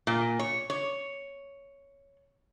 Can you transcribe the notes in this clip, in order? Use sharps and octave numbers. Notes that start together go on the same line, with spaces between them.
A#2
C#5
C#5